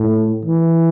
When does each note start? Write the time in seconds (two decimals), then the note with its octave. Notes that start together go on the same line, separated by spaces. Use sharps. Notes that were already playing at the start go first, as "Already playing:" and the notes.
Already playing: A2
0.45 E3